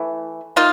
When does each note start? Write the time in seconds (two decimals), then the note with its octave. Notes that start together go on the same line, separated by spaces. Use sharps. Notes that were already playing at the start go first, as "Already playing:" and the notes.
Already playing: E3 A3
0.56 A#3 D#4 F4